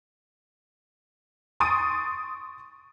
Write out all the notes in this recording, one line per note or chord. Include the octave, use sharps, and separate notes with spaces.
C6 C#6 D#6 A6 D7 D#7